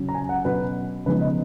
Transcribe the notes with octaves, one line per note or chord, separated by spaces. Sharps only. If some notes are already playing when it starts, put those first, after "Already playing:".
Already playing: C#3 F#3 C#4
A#5
G#5
F#5
B2 F#3 C#4 B4
C#3 F3 G#3 B3 D#4 B4
D#5